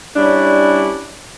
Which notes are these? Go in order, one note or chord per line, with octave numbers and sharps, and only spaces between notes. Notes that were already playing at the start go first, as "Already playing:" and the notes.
G3 C#4 D4 E4